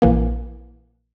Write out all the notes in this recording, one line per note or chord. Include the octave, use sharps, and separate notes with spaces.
A#1 E3 A#3